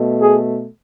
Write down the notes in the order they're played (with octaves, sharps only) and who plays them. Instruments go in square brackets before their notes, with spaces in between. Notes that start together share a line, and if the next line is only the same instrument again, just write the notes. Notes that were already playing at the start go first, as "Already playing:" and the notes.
Already playing: [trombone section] B2 A3
G#4